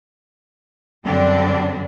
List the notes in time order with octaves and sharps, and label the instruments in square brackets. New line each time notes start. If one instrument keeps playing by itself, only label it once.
[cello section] F#2 D3 G3 C4 D4